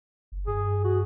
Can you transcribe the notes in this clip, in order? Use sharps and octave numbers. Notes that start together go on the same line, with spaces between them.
F#1
G2 G#4
F#4